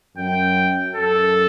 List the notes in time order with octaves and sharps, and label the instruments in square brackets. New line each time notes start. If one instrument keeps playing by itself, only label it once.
[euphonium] F#2 [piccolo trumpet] G5
[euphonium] F#2 [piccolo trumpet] A4